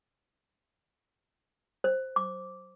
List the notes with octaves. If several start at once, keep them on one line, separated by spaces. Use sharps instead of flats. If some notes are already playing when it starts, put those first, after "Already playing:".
C5
D6